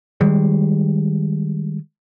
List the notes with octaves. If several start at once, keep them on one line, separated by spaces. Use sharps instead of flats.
D#3 G3 G#3